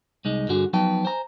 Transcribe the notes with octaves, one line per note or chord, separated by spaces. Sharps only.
C2 G#3 D#4
G2 D3 F#4 G#4
F3 F#3 B3 D#4 G5 A5
C5 G#5 A#5